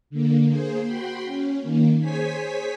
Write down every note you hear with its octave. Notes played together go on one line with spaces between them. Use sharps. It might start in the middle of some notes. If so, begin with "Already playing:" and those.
D3 A#3
A#3 G#4 C5
F#4 G5 B5 C6
C#4
D#3 A#3
G#4 C5 C#5 G#5 B6